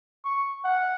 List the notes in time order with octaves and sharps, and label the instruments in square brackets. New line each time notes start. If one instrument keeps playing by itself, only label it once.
[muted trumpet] C#6
F#5